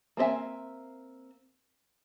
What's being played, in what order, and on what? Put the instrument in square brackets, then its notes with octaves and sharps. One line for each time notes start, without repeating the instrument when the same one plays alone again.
[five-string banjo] A#3 C4 A4 E5 G#5